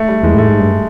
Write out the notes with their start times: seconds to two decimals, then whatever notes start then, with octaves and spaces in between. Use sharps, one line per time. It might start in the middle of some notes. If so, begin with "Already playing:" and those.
Already playing: A3
0.08 G3
0.23 E2 G#3
0.35 A2 A3
0.48 G#2
0.59 G2